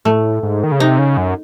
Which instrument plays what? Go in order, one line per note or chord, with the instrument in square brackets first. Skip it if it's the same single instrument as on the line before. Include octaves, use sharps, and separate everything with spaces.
[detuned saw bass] A2 [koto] A3
[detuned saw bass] G#2
D#3
C#3
[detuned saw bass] C3 [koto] D#4
[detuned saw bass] C#3
F#2